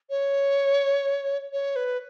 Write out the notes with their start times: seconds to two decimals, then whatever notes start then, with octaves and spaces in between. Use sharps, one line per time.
0.10 C#5
1.53 C#5
1.76 B4